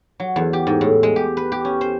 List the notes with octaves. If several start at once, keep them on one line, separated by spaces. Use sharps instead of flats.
F#3
E2
G4
G#2
A2
G#3
G4
B4
G4
C#4
C5